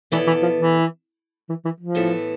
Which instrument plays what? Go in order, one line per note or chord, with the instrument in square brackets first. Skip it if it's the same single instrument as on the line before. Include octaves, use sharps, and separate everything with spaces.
[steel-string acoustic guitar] B2 B3 E4 A4 D5 [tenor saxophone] E3
[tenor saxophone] E3
F3
E3
E3
E3
F3
[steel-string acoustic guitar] A2 E3 B3 E4 A4